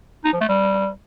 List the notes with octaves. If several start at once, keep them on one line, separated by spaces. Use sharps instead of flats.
D#4
F3
A3
G3